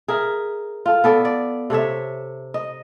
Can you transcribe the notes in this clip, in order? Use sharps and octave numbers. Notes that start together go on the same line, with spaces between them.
G#4 A#4 E5
F4 A4
B3 A4 D5
D5
C3 A4 C#5 E5
D#5